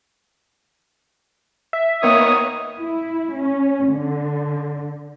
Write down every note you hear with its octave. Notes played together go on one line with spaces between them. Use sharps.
E5
D#3 A#3 B3 C#5 D#6
E4
C#4
D3